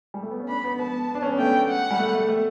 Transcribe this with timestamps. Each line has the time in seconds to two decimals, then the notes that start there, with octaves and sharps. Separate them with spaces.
0.14 G3
0.22 A3
0.31 B3
0.40 C#4
0.49 D4 B5
0.64 B3
0.79 B3 A5
1.15 D4
1.22 C#4
1.31 B3
1.39 A3 G5
1.69 F#5
1.91 G3
1.99 A3
2.13 A3
2.29 A3